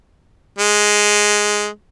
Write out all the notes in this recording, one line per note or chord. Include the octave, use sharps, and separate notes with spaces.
G#3